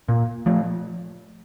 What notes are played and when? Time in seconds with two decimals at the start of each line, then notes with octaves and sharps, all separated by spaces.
0.08 A#2
0.46 F3 A3